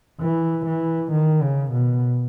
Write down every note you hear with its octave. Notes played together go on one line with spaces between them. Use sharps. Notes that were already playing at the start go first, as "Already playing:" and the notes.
E3
E3
D#3
C#3
B2